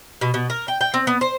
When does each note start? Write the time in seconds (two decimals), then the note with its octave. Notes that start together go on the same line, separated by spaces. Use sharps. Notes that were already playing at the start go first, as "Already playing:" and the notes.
0.21 B2
0.34 B2
0.50 A#4
0.68 G5
0.81 G5
0.94 C4
1.07 B3
1.21 C5